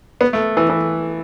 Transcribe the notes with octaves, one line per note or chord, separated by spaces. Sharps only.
B3
A3
E3
E3